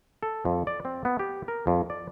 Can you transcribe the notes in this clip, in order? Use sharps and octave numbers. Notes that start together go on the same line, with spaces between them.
A4
F2
D5
C4
B3
G4
A#4
F2
D5